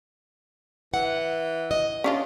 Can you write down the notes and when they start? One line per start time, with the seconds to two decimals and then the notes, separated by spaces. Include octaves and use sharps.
0.94 E3 F#5
1.71 D#5
2.04 C#4 D4 F4